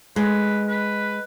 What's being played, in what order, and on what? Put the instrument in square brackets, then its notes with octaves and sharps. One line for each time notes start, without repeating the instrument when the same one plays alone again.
[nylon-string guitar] G#3 [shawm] B4
[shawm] B4